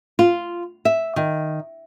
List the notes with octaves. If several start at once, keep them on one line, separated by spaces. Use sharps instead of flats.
F4
E5
D#3